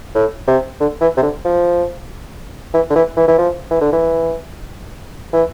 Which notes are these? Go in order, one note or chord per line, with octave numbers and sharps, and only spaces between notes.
A2
C3
D3
E3
C3
D3
F3
E3
D3
E3
E3
E3
F3
E3
D3
E3
E3